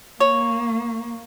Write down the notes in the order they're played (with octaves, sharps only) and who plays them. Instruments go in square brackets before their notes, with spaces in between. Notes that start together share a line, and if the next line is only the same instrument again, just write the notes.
[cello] A#3 [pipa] C#5